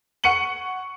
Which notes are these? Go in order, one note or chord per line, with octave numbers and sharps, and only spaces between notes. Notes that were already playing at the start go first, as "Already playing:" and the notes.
F#5 C#6 C#7 D#7 F#7